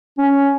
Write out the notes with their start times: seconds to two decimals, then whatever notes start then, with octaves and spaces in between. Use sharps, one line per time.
0.18 C#4